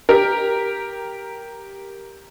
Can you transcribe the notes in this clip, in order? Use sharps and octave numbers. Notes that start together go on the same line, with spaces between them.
G4 A#4